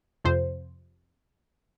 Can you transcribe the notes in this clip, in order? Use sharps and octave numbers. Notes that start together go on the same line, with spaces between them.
F2 C3 F3 C5